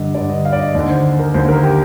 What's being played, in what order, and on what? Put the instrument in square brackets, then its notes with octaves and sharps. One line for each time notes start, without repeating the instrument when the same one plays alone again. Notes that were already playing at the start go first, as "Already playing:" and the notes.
Already playing: [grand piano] G2 D3 D#5
G2 D3 D5
D#5
F5
D5
D#5
D#2 D5
D3
C5
A#4
D#2 D3 C5
A#4
G4